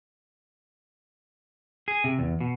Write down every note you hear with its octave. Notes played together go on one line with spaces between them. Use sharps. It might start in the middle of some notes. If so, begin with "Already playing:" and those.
G#4
C3
E2
B2